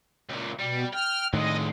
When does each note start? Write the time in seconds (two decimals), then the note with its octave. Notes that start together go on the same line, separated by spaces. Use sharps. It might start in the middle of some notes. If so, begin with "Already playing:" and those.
0.29 C#2 A#2
0.59 B2 G3
0.93 G5 F6
1.34 A2 D3 D#3 G#3 D#5